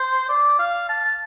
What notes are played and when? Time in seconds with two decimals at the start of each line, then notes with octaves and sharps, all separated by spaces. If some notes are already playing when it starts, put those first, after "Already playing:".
Already playing: C5
0.29 D5
0.59 F5
0.89 A5
1.04 A5